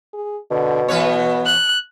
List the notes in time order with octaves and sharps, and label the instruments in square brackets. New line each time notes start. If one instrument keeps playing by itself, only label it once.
[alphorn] G#4
[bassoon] B2 [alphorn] D3
[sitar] E3 B4 C#5 [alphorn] B3
[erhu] F#6